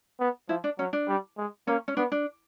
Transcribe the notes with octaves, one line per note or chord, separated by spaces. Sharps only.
B3
F3 E4
D4
F#3 C#4
D4
G3
G#3
A#3 C#4
C#4
B3 D4
D4